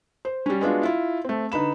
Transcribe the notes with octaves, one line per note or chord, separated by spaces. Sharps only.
C5
G3 C#4
G#3 B3 D4 F4 F#4
E4 F4
A3 C4
D3 D#4 B4 B5 E7